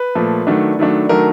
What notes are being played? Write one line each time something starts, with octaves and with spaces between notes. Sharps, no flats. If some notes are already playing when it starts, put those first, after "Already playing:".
Already playing: B4
A#2 F3 A3
D#3 F#3 A3 D4
D#3 F#3 A3 D4
D#3 F#3 A3 D4 A#4